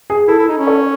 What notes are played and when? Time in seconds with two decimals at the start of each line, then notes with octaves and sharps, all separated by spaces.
0.10 G#4
0.28 E4 A4
0.38 E4
0.48 D#4
0.57 C#4
0.67 A4 C#5